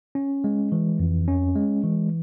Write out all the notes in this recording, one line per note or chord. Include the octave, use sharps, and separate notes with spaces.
C#4
G#3
E3
F2
C#4
G#3
E3